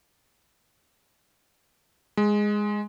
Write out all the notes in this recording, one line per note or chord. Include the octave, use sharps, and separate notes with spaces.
G#3